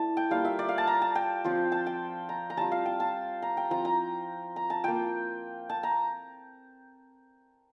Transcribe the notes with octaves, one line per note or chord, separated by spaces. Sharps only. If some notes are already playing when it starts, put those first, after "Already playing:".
Already playing: A3 E4 D5 A5
G5
G3 A#3 F4 F5
E5
D5
F5
A5
A#5
A5
G5
F3 C4 F4
A5
G5
A#5
A#5
G3 C4 F4 A5
F5
G5
A5
A#5
G5
F3 C4 F4 A#5
A#5
A#5
A5
A#3 F4 G5
A5
A#5